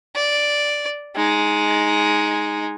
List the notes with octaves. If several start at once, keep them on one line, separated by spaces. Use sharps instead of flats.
D5
G#3 D#4